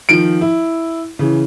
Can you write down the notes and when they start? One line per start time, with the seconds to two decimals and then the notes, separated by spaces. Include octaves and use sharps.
0.09 D#3 F3 D7
0.41 E4
1.19 C#3 E3